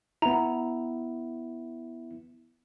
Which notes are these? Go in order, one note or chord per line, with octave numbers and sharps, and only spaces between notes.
B3 E4 A#5